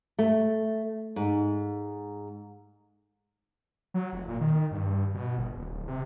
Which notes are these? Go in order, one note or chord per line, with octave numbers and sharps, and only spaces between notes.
A3
G#2
F#3
F1
A#2
D#3
G2
B2
G1
D#1
D1
C3